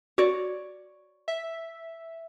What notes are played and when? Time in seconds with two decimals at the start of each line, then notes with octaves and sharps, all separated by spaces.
0.18 F#4 C#5 D5
1.28 E5